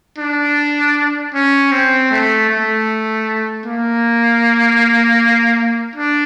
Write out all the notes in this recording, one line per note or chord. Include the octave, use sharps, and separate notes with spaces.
D4
C#4
C4
A3
A3
A#3
D4